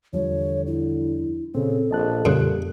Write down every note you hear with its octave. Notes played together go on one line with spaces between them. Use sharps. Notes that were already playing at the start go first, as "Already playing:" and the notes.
E2 D3 F3 G3 C#5
E4
A#2 C#3 C4 A4
A#1 D#5 A5 F#6
F2 A#2 C#3 G3 F#6